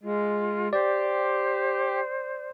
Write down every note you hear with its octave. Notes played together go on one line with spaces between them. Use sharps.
G#3 F4
G4 C5 D5